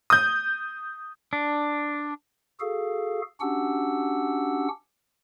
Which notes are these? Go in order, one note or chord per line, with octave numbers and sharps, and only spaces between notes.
D#6 G6
D4
F#4 G#4 A4 F5
C#4 D4 F#4 G4 F#5 E6